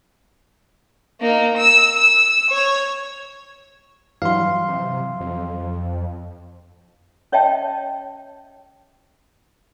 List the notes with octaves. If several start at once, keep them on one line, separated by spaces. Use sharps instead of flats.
A#3 D#4
E6
E6
C#5
G2 E3 F#3 F5 C6
C3
F2
C#4 C#5 D#5 E5 G5 A5